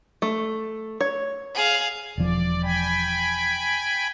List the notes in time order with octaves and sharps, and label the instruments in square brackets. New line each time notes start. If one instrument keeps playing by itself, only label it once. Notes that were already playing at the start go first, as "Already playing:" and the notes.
[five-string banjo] A3
C#5
[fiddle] G#4 F5
[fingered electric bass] E1 F3 [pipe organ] D5
[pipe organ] G5 G#5 B5